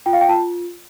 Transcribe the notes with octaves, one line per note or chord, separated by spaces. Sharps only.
F4 G5
F5
G5
F4 A5